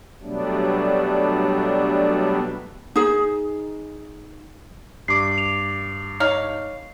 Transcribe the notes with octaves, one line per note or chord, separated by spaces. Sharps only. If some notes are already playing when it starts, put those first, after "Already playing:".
B2 F#3 G3 A3 B3 D4
D#4 G#4
G2 D6 C7
F7
D#4 C#5 F5